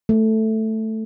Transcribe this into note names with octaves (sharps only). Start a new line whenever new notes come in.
A3